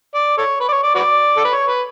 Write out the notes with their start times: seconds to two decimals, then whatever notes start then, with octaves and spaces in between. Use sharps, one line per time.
0.15 D5
0.37 A4 C#5
0.60 B4
0.68 D5
0.72 C#5
0.83 D5
0.95 F#4 B4 D5
1.37 A4
1.45 B4
1.52 C#5
1.68 B4